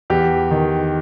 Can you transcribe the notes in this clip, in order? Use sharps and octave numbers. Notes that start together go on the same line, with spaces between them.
E2 G4
D#3